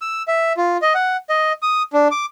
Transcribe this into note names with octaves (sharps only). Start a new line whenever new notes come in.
E6
E5
F4
D#5
F#5
D#5
D#6
D4
D6